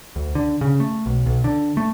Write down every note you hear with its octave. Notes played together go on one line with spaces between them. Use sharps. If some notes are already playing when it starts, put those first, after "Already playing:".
D2
D3
C#3
A3
B1
B1
D3
A3